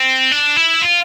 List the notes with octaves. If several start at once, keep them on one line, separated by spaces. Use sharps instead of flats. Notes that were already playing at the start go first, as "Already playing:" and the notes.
Already playing: C4
D4
E4
F4